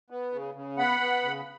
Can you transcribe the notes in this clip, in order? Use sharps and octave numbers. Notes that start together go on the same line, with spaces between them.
B3
C#3
C#3
B3 F#5 B5
B3
C#3